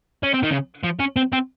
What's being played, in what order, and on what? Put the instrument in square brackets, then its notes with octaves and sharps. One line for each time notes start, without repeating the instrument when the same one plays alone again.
[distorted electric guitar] C#4
C4
D#3
C#3
F3
C#4
C4
C4